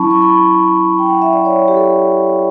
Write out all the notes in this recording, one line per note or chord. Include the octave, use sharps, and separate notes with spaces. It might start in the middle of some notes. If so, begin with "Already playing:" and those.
Already playing: F#3 C#4 E4 A5 B5 C#6
C#6
B5
G5
F#5
E5
D5
C#5
G4
A4